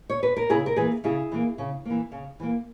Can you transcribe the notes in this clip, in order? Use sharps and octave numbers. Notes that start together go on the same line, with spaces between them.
C#5
B4
A#4
C#3 E4 G#4
A#4
E3 A#3 G#4 B4
C#3 E4 G#4
E3 A#3
C#3
E3 A#3
C#3
E3 A#3